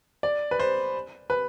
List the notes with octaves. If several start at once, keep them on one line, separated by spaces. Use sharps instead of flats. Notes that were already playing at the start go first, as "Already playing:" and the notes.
D5
B4
C5
B4